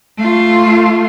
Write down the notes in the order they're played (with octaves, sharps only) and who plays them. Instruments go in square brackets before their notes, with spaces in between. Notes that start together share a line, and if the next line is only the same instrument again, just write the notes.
[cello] A3 F4